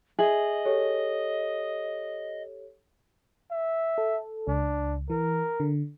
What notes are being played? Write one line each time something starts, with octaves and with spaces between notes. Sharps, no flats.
G#4 D#5 E5 F#7
G4 A4 C#5
E5
A4
C#2 D4
E3 A#4
D3